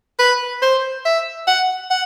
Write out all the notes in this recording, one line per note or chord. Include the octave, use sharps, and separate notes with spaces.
B4
C5
E5
F#5
F#5